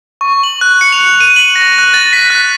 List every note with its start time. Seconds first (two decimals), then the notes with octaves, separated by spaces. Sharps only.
0.21 C#6
0.43 F#7
0.61 F#6
0.81 C#7
0.92 F7
1.20 D#7
1.36 F#7
1.56 A#6
1.78 F#6
1.94 A6
2.13 B6
2.30 F#6